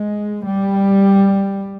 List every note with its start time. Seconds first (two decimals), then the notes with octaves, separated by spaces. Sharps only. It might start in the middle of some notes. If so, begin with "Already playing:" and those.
Already playing: G#3
0.47 G3